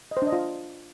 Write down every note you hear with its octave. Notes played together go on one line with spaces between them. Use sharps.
D#5
C5
D4
D#5
F4